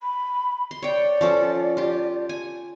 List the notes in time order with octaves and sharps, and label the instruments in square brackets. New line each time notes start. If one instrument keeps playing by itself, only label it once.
[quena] B5
[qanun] C6
[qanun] C#5 G5 [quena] D5
[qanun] F3 C#4 A4
F4 G4
G#5